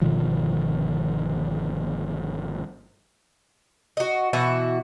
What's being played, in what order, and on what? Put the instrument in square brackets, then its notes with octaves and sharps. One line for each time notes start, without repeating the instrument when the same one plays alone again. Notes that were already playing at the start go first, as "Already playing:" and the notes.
[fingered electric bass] G1 B2 D#3 F3
[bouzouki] F#4 D#5
B2 E3 F#4 E5